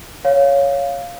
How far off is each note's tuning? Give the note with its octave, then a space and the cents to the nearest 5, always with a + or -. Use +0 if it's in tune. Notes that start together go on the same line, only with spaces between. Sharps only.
C#5 +5 F5 +0